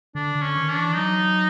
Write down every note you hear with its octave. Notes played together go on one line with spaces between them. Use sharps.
D3 D4
D3
C#4
D#3
D4
E3
F#3 D#4